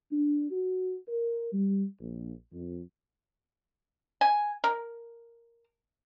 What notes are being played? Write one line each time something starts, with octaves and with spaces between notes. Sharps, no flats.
D4
F#4
A#4
G3
A#1
F2
G#5
A#4